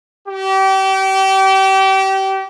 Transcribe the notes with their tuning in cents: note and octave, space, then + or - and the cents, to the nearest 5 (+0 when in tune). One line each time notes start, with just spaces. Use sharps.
G4 -30